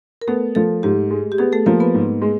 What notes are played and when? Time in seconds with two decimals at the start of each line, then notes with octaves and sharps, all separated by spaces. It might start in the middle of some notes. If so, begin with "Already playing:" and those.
0.22 A#4
0.27 A3 B3 A4
0.55 F3 A3 A4
0.83 G#2 G4
1.10 G#3
1.32 G4
1.38 B3 G#4
1.53 A3 A4
1.66 F3 A#3 A#4
1.80 B3 B4
1.94 G#2
2.21 G#3